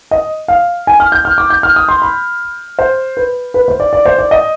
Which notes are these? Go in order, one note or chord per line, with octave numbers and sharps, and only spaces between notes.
D#5
F5
G#5
F6
G6
F6
D6
G6
F6
D#6
C6
B5
C5
B4
B4
C5
D5
D5
C5
D5
D#5